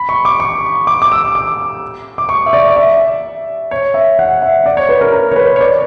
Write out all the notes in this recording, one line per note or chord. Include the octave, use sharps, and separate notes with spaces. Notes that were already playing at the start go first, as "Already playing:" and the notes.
Already playing: B5
C#6
D6
C#6
D6
D6
E6
D6
D6
C#6
E5
D5
D5
E5
C#5
E5
F#5
E5
D5
C#5
B4
A#4
A#4
C#5
B4
C#5
D5